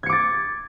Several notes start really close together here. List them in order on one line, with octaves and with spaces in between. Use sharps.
G#6 C#7 D6 A6